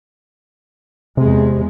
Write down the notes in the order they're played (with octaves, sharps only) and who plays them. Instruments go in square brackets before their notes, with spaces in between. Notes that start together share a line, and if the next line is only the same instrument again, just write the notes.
[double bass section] E2 G#3 [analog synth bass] C3